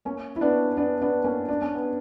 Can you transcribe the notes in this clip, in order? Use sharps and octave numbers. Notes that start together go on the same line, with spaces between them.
A#3 C#4
E4
B3 D4
B3 D4
B3 D4
A#3 C#4
D4
C#4
B3